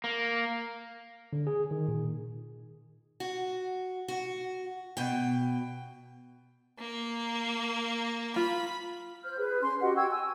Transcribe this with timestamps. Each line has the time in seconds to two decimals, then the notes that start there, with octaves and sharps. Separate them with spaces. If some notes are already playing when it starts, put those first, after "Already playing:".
0.04 A#3
1.33 D3
1.47 G#4
1.71 D#3
1.88 A#2
3.20 F#4
4.08 F#4
4.97 B2 G5
6.79 A#3
8.36 F4 B5
9.23 C5 F6 G6
9.38 G#4 B4
9.62 C#4 C6
9.81 F#4 G4 D#5 F#5
9.96 G5 C#6 E6 G#6
10.10 G#5 E6